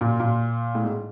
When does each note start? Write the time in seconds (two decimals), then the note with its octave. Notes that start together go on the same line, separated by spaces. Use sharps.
0.01 A#2
0.20 A#2
0.75 A2
0.84 G#2